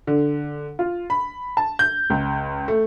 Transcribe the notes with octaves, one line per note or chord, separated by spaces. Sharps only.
D3
F4
B5
A5
G6
C#2
A3